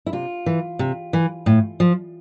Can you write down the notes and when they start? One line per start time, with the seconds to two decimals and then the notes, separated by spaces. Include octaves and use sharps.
0.06 E4
0.13 C3 F4
0.46 E3
0.79 C3
1.13 E3
1.46 A2
1.80 F3